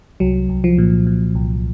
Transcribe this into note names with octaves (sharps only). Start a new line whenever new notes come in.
C2 F#3
C2
F3
A#2
A#2
C2